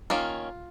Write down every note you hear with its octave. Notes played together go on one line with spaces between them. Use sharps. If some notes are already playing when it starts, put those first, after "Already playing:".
D#3 A#3 C#4 F4